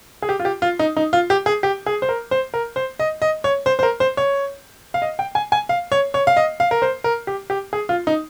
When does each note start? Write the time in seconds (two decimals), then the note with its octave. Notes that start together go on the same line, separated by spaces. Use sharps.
0.22 G#4
0.29 G4
0.39 F4
0.45 G4
0.62 F4
0.79 D#4
0.97 D#4
1.13 F4
1.30 G4
1.46 G#4
1.63 G4
1.86 G#4
2.02 C5
2.09 A#4
2.31 C5
2.54 A#4
2.76 C5
2.99 D#5
3.22 D#5
3.44 C#5
3.66 C5
3.79 C5
3.83 A#4
4.00 C5
4.17 C#5
4.94 F5
5.02 D#5
5.19 G5
5.35 G#5
5.52 G#5
5.69 F5
5.92 C#5
6.14 C#5
6.27 F5
6.37 D#5
6.60 F5
6.71 A#4
6.82 C5
7.04 A#4
7.27 G4
7.50 G4
7.73 G#4
7.89 F4
8.07 D#4